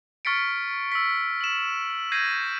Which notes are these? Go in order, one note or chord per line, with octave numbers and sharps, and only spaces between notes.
C#6 F6 A6 B6 C#7 D7
E6 B6
E7 F#7
G6 G#6 A#6 C7 D#7